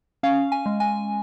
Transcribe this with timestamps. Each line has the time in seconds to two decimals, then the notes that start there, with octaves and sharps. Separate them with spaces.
0.23 C#4 F5
0.52 G#5
0.66 G#3
0.80 G#5